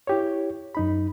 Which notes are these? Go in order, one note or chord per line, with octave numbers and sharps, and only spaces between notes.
E4 G4 C#5
F#2 D#4 B5